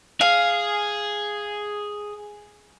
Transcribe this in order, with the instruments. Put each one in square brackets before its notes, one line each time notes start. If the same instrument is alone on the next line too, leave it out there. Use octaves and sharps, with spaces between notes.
[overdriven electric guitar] G#4 [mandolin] F5